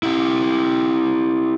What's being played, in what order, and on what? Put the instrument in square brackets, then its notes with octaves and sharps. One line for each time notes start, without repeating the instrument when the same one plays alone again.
[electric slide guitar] E4 G4